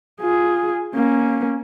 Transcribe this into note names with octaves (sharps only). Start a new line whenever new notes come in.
F4 G#4
A#3 C#4